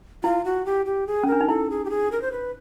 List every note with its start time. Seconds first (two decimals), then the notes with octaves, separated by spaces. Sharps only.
0.23 E4 F4
0.45 F#4
0.66 G4
0.86 G4
1.07 G#4
1.23 C#4
1.28 D4 A#4
1.41 D#4
1.48 E4 A4
1.70 G#4
1.85 G4
1.90 G#4
2.12 A#4
2.22 C5
2.32 B4